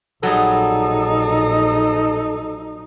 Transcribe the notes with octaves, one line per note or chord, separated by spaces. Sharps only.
A#1 F#3 G3 D#4 G#4 A4